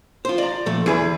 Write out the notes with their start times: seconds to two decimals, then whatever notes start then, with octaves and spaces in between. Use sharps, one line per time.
0.25 F4 C5
0.38 D5 A#5
0.66 A#2 F3 A3
0.86 E2 E3 G#4 B4